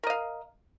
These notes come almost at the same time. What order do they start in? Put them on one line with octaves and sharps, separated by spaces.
A#4 D#5 F5